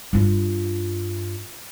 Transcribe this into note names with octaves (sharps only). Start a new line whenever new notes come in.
G2 F4